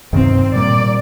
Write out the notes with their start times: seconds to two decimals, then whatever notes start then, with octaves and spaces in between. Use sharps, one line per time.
0.13 G2 C3 D#3 C4
0.54 A#2 G3 A#3 D5